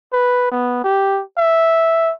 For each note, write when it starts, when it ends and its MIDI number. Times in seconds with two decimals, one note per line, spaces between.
0.13 0.48 71
0.52 0.83 59
0.84 1.22 67
1.38 2.13 76